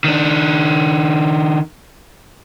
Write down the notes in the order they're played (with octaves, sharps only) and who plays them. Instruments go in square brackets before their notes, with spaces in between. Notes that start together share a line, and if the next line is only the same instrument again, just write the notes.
[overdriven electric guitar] D#3 D4